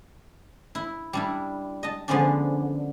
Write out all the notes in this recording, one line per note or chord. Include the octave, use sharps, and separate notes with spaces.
E4
G3 D4 E4
D#5 A5
D3 F3 G#3 B3 C#4 D4